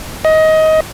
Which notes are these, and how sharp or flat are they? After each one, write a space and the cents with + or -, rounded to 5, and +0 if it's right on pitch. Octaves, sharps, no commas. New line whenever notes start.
D#5 +20